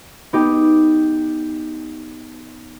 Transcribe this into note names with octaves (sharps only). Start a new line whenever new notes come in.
B3 D#4 G4